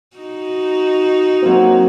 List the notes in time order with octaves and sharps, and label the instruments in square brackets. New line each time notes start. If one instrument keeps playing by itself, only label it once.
[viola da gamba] D#4 F#4
[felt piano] F#3 A#3 C4